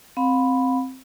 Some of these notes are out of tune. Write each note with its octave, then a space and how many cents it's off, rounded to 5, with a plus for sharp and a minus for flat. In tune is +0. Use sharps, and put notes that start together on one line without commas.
C4 +0 F5 +35 B5 +0